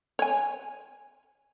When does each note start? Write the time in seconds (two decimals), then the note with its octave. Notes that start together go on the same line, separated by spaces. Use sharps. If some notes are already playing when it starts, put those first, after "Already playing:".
0.19 C#5 G#5